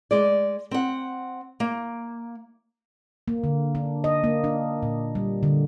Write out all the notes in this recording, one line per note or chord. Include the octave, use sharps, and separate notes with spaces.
G#3 D5
C4 F#5
A#3
A#3
D3
D4
D#5
A#3
D4
A#2
G3
D3